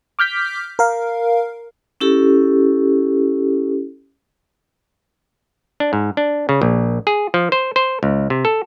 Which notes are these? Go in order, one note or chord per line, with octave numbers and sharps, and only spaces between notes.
D6 F6 G6 B6
A#4 F5
C#4 E4 G4 A4
D4
G#2
D4
C#3
A#1
G#4
F3
C5
C5
C#2
C3
A4